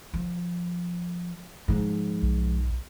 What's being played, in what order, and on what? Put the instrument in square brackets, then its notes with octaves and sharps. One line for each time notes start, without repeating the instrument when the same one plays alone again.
[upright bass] F3
G#2 F3
[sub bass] B1